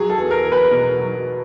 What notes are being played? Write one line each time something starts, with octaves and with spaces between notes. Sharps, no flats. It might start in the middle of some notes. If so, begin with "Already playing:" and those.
Already playing: F#3 G#4
A4
E2
A#4
E2
B4
B2 A#4
F#3